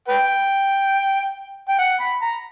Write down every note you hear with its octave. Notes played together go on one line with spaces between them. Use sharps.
B4 G5
G5
F#5
B5
A#5